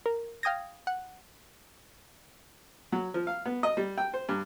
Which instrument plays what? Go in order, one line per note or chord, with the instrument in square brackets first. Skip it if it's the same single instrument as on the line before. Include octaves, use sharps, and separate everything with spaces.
[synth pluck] A#4
F5 G5 D#6 G#6 A#6
F#5
[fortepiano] F#3
F3
F5
B3
D#5
G3
G5
C5
G2